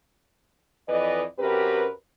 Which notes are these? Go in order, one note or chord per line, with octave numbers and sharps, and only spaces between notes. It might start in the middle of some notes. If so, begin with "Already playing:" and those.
F2 E3 B4 D5 D#5
F#2 C4 G4 A#4 B4